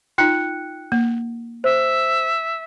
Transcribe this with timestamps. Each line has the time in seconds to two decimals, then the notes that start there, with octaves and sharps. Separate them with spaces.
0.18 D#4 F4 G5 F#6 C#7
0.92 A#3
1.64 C5 E5